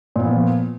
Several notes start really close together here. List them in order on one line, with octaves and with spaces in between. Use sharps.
A#2 B3 F3